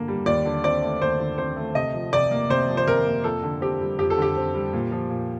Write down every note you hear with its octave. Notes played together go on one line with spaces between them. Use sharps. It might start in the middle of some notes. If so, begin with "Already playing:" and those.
Already playing: G2 D3 A#3
G3
D#2 D5
D3
C4 D5
A3
D#2 C5
D3
C4 C5
A3
C3 D#5
F3
C3 D5
A#3
C3 C5
F3
C5
C3 A#4
A#3
F2 A4
D3
C4 G4
G3
F2 G4
A4
D3 G4
C4
G3
A#2
F3
A#2